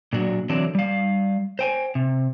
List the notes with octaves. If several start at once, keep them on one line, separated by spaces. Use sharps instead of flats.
A#2 F#3 D4 F#4
D3 E3 F#3 C4 D4
G3 F5
C5 G5 G#5
C3